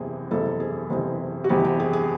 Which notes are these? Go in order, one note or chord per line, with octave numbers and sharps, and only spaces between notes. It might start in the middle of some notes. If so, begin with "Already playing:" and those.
Already playing: F#1 E2 C3 G#4
F#1 E2 C3 A4
G#4
F#1 E2 C3
F#4
F#1 E2 C3 G4
G4
G#4
G#4